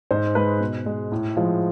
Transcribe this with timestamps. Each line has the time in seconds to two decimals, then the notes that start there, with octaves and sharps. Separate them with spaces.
0.11 G#2 C5
0.35 G#3 B4
0.60 B2
0.86 G#3
1.12 A2
1.37 F3 G#3